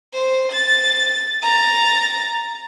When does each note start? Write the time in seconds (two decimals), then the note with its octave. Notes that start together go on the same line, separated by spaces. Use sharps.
0.14 C5
0.52 A6
1.42 A#5 A6